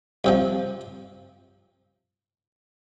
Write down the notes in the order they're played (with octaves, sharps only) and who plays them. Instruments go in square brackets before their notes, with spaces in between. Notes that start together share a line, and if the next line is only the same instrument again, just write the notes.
[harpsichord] C2 C3 F3